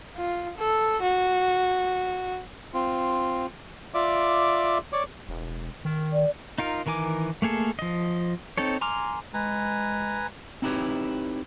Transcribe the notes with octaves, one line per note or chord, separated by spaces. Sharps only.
F4
A4
F#4
C4 F4
F4 D5 E5 D6
C#5 D5 D6
E1
D#3
D5
D#4 F4 A#4
D#3 E3 A#4 G#5 D6
A3 A#3 G#4 A4
F3 D#5
C4 D#4 A4 C#5
G#5 A#5 C6 D6 F6
G#3 B4 G#5 A#5
C4 D#4 E4 G4 B4 C#5